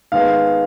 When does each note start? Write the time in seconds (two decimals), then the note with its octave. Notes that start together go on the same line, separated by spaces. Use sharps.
0.12 D#3 G#3 B3 F5